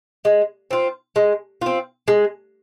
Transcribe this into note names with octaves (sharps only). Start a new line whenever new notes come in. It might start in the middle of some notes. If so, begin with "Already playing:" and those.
G#3
C4 F4
G#3
C4 F4
G#3